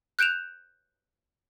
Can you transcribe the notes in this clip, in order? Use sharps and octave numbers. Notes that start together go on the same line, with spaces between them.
F#6 G6 D7 E7 F7